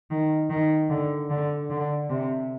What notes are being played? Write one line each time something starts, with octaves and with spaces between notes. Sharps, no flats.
D#3
D#3
D3
D3
D3
C3